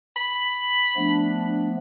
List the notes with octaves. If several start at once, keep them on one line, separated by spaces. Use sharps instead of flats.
B5
F3 A3 B3 D4